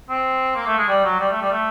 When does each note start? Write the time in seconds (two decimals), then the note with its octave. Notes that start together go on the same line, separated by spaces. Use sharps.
0.09 C4
0.56 A#3
0.67 A3
0.78 G#3
0.88 G3
1.05 F#3
1.20 G3
1.31 A3
1.41 G3
1.52 A3